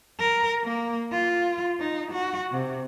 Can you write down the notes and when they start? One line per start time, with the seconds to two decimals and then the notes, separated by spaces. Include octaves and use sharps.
0.19 A#4
0.64 A#3
1.12 F4
1.80 D#4
2.12 F#4
2.52 C3